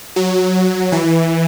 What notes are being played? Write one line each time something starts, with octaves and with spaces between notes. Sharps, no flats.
F#3
E3